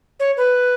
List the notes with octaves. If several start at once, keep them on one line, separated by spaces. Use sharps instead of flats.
C#5
B4